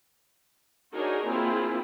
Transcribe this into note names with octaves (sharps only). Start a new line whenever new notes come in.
D4 D#4 F#4 G#4 A#4 C#5
A#3 C4 E4 F4 G#4